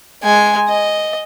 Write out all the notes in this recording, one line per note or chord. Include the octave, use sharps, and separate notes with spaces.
G#3 G#5
D#5